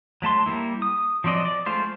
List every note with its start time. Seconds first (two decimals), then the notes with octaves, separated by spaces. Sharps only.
0.22 F#3 A3 A5 C6
0.46 G3 A#3 E4
0.82 D#6
1.24 F3 F#3 C4 D5 D#5
1.45 D5
1.66 G#3 A3 F4 C5